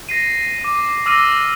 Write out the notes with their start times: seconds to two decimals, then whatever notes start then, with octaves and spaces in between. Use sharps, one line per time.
0.09 A#6 C7 D#7
0.61 D6 D#7
1.06 D6 E6 F6 A#6 D#7